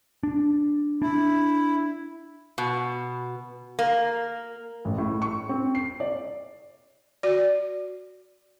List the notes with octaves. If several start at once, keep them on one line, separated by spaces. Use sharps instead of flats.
D4
D4 E4
B2
A#3
A1
A2
C#6
C4
C7
D5
F#4 D5